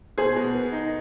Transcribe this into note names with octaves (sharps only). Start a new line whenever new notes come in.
B2 G#4 C5
B2
B3
D#4